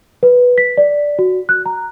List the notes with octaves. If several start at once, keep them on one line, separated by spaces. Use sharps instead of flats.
B4
B6
D5
F#4
F#6
A#5